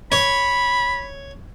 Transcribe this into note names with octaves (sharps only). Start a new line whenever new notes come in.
C#5 B5